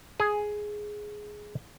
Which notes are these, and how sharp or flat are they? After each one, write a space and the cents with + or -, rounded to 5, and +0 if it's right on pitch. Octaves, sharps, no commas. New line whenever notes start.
G#4 +5